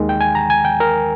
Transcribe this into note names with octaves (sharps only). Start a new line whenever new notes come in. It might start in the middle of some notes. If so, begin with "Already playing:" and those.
Already playing: D#2 D#3 G#3
G5
G#5
A#5
G#5
G5
A#4